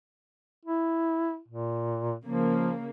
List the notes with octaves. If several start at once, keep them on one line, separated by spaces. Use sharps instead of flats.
E4
A#2
C#3 F3 A#3